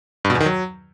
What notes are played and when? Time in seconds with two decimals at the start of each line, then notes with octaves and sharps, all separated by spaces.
0.25 G2
0.30 B2
0.35 E2
0.40 D#3
0.46 F#3